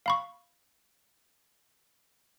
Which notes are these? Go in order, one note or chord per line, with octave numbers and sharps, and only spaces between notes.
F5 B5 C#6